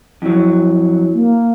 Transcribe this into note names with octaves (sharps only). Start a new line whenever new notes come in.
F2 F#3 E4
A#3